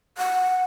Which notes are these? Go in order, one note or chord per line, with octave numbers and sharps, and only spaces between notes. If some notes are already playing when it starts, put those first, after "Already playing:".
F#5